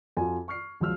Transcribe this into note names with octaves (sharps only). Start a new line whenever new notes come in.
F2 F4 F#4 G#5
C#6 F6 C7
C#2 F3 F#3 F4 E6 F6